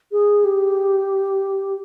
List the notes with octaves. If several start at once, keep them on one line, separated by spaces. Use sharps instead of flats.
G#4
G4